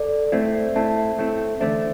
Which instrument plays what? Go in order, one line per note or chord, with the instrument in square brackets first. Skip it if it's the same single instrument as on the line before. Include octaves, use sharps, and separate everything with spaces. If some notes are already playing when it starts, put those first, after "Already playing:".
Already playing: [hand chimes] A4 D5
[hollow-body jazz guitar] A2 A3 C4 E4 [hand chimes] C5 E5
[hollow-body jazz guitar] A2 A3 C4 E4 [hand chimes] E5 A5
[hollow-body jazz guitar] A2 A3 C4 E4
[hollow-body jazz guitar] E2 D3 A3 D4 [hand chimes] C5 E5